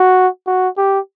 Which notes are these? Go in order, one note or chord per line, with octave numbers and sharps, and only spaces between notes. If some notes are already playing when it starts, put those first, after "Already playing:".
Already playing: F#4
F#4
G4